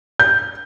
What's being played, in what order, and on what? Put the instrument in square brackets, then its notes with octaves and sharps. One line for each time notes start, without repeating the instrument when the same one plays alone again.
[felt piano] G6